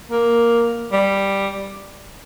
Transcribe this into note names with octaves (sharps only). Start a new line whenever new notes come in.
A#3
G3